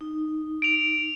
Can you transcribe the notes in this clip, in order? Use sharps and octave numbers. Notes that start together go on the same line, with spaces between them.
D#4
D7 F7